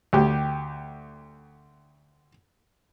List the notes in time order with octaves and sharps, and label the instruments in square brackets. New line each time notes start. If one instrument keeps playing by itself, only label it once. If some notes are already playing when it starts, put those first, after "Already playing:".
[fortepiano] D2 G4